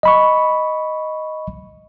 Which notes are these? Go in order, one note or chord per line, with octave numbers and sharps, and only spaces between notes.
D#5 B5 C#6